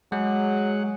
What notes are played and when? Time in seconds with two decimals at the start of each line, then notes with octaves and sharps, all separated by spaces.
0.12 F#3 G#3 G#4 F#5